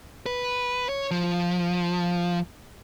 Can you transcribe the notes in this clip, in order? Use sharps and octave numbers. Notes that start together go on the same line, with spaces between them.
B4
C#5
F3